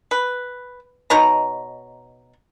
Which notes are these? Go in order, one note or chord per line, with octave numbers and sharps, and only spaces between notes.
B4
B2 D#4 C#5 A#5